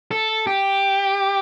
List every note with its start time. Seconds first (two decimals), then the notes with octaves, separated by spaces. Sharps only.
0.11 A4
0.47 G4